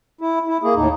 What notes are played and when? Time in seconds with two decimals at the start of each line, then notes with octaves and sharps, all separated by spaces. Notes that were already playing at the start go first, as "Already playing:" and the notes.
0.21 E4
0.47 E4
0.63 A#3 G#4
0.75 D#2 A2 D#4